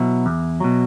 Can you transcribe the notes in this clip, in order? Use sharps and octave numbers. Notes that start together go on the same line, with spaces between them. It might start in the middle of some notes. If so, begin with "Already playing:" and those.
Already playing: B2 F#3 E4
E2
B2 F#3